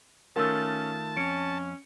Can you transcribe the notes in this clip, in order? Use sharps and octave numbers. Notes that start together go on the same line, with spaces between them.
D#3 A3 C#4 F4 A#4 A5 E6
F2 C#4 C#7 D7